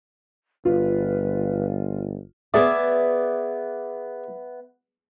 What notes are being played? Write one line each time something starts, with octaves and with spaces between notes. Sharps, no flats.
G1 F4 B4
B3 G#4 D5 E5